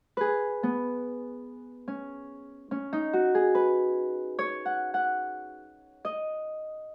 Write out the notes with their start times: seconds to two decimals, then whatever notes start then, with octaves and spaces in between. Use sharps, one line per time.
0.17 G#4 B4
0.63 B3
1.88 C#4
2.71 C#4
2.93 D#4
3.13 F#4
3.35 G#4
3.55 B4
4.39 C#5
4.66 F#5
4.94 F#5
6.05 D#5